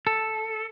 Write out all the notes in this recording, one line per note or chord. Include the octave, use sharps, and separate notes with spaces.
A4